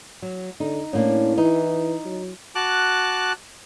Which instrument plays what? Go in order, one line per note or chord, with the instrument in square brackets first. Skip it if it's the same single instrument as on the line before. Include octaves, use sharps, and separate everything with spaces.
[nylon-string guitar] F#3
[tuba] D3 [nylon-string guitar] D#4
[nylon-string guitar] A2 A#3 D4 [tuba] C#4
[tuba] E3 [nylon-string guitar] D#4
[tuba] F#3
[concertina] F#4 A5 D6 F#6